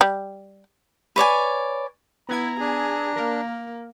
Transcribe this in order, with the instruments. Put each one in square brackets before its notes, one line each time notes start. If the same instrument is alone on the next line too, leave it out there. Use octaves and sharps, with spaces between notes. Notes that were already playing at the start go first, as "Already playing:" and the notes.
[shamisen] G3
[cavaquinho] B4 C#5 D5 G#5
[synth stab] B3 G#6 [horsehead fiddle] E4 [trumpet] A#5
[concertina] D4 [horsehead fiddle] G#4 G#5
[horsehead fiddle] A#3 [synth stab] A#4